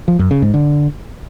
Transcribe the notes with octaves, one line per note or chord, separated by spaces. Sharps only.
F3
F#2
C#3
G#2
D3